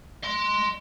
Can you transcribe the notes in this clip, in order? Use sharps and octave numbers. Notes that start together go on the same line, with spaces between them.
D#5 C6